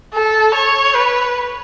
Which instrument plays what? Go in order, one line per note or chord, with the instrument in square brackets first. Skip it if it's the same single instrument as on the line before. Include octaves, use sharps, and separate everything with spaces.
[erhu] A4
C#5
B4